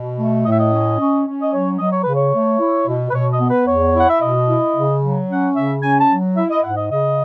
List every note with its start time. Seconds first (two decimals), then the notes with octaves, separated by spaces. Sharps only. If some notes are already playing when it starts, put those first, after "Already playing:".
Already playing: B2
0.18 A3
0.45 A2 D#5
0.52 E5
0.60 D#5
0.72 C#4
1.00 C#4
1.26 C#4
1.42 D#5
1.53 F#3 C#5
1.79 F#3 D#5
1.92 C#5
2.03 C#3 B4
2.15 C#5
2.34 A3
2.60 E4
2.87 B2
3.10 B4
3.14 B2 C#5
3.32 D#5
3.40 B3
3.50 B4
3.67 E2 C#5
3.95 E4 F#5
4.09 E5
4.21 B2 D#5
4.48 E4
4.75 C#3
5.02 F#3
5.29 C#4 F#5
5.55 C#3 E5
5.82 C#4 G#5
6.00 A5
6.10 F#3
6.36 E4 E5
6.50 D#5
6.62 G#2 F#5
6.77 D#5
6.90 C#3 D#5